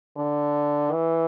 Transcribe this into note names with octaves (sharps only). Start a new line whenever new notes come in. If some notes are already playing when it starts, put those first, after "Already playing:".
D3
E3